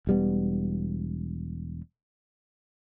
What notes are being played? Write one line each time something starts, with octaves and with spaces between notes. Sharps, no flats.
E1 G3 B3